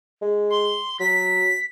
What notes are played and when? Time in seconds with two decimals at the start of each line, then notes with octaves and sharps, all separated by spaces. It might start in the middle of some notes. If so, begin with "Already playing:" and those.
0.22 G#3
0.50 C6
1.00 F#3 B6